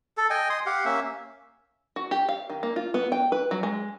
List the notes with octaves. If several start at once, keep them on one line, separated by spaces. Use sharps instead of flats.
A4
D#5 G5 G#5
C6 D#6
G4 F5 F#5
A#3 C#4 E5
F#4
G4
F5
D#3
A#3
F4
B3
G5
B4
F#3
G#3